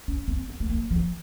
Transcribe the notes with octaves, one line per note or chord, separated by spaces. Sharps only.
C#4
C4
B3
A3
A#3
F3